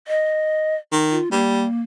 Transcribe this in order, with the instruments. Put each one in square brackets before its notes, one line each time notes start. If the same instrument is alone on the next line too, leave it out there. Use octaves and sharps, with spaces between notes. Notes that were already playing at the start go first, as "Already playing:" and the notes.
[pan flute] D#5
[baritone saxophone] D#3
[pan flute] F4
[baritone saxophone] G3 [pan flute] A#3